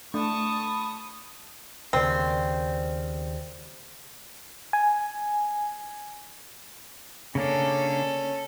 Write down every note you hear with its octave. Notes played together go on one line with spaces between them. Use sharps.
A3 D4 A5 B5 C#6 D#6
D#2 C#3 C4 D5
G#5
C#3 A#3 C#4 D4 A4